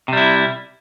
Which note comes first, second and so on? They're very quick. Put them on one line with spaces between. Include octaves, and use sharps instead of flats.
C3 G3 E4